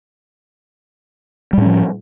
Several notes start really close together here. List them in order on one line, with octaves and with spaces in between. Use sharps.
G3 A2 C#4 F3